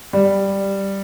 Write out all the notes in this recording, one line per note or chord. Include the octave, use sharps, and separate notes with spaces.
G3